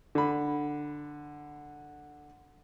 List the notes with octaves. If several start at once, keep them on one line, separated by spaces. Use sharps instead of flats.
D3 B5